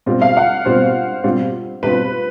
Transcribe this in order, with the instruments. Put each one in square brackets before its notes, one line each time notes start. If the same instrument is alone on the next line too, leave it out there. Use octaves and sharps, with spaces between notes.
[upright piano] B2 G3 C4 F4
[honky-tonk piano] F5
F#5
[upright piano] B2 G3 C4 F4 [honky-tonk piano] C5
[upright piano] B2 G3 C4 F4
[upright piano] B2 G3 C4 F4 [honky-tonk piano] B4